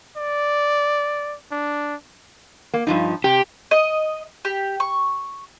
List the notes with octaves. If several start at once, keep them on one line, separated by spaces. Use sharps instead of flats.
D5
D4
A#3
G2 F3 D#4
C3 G4
D#5
G4
C#6